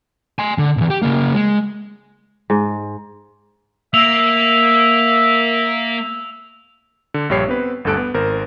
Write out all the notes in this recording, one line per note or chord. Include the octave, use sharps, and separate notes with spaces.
G#5 C6
D3
E2 B2
G4
C#3 A#3
G#3
G#2
A#3 E5 E6 F7
D3
A#1 G2 G4 C#5 C7
B3 C4 B4
G1 D2 G2 A4 F#6 D7
B3
G#1 A#4 C5